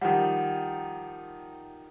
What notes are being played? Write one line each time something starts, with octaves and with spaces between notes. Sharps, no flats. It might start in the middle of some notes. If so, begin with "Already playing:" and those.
D#3 F3 G3 F#5